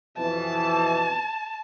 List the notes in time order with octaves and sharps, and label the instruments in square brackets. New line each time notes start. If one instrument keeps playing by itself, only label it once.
[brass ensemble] F2 B2 E3 [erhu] A5